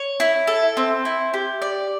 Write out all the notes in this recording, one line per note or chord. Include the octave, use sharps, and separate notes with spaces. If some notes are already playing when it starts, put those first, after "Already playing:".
Already playing: C#5
E4
A4
C4
E4
G4
D5